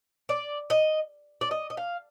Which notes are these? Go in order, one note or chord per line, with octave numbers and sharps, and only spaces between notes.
D5
D#5
D5
D#5
D#5
F5